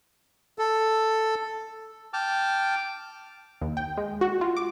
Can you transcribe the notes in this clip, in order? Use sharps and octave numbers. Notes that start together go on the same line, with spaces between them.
A4
G5 A5 D6 F6
D#2
G5
G#3
F#4
F4
D6